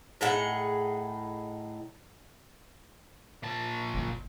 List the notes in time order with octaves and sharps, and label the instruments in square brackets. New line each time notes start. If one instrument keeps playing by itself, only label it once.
[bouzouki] A2 D#4 G#4 F#5
[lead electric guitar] A#2 A5
[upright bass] F#1 D#4